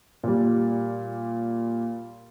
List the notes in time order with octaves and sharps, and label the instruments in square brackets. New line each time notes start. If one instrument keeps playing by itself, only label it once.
[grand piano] A#2 G3